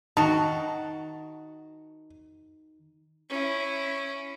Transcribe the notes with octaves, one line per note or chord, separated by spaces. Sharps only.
D#3 F#4 A5
C#4 E4